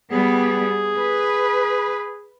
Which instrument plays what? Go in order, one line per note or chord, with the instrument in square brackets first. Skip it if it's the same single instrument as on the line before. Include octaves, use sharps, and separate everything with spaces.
[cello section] G3 B3 [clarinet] G#4
[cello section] B4